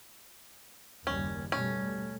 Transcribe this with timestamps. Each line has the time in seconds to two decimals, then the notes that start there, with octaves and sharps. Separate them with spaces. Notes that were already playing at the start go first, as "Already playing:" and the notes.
1.07 F#1 D#2 G3 C#4
1.52 B2 G3 A3 C#4